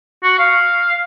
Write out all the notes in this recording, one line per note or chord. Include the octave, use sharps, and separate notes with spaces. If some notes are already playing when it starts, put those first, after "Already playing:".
F#4
F5